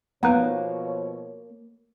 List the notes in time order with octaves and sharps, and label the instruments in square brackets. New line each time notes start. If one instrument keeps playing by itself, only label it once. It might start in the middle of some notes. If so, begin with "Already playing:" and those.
[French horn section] B2 F3 C#5 [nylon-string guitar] A#3 [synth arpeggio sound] B3 D#4 B4